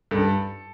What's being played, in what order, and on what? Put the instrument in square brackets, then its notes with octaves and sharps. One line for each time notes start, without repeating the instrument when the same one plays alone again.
[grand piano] G2 [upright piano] A4